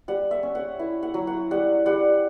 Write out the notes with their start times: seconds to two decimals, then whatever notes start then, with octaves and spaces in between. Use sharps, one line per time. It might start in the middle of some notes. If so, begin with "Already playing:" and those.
0.08 G3 F#5
0.31 E5
0.43 C#4
0.55 F#5
0.79 E4 E5
1.03 F#5
1.14 F#3
1.27 F#5
1.51 G3 F#5
1.86 G3 F#5